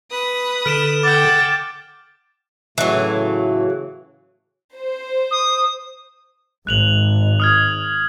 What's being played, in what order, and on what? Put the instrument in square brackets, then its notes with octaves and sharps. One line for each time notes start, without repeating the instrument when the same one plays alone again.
[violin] B4 D#6
[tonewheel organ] D3 A4 [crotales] F6 D7 E7
[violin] F#5 G5 [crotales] D6 F6 [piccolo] A6
[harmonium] A2 C#3 A3 [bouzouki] E3 F#3
[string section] C5
[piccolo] D#6
[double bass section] G#1 [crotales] F#6 F7 F#7
[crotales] D#6 F6 G#6